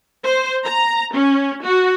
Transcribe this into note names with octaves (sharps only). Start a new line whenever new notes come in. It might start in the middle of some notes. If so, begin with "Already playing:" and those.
C5
A#5
C#4
F#4